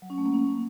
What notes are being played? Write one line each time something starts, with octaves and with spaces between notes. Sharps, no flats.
F#3
C#4
A3
A#3
C#4